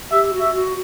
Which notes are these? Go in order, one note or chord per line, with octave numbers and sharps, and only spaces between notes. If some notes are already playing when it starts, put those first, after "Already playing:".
G4 E5
F#4
E5
F#4